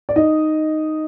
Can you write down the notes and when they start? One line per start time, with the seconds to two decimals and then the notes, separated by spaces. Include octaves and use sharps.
0.09 D5
0.16 D#4 D#5